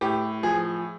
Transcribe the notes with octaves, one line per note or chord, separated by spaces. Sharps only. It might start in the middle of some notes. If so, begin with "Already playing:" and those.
A2 G4
F3 G#4